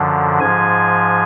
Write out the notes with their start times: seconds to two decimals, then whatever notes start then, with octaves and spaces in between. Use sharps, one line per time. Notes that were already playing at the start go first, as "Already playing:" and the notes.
Already playing: F#2 D3 F3
0.40 G#2 F3 G#5